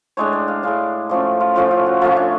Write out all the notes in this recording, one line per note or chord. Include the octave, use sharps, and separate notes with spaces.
A2 G#3 D4 C#5
D5
F5
A2 G#3 D4 F5
A2 F3 A3 C#4 D5
F4
A2 F3 A3 C#4 F4
F4
F#4
F3 A3 C#4 F4
D4